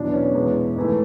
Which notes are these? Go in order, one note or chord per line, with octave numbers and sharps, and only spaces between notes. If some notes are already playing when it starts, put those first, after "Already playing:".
Already playing: E2 B2 F#3 D4
C#4
E2 B2 G#3
G#2 E3 A3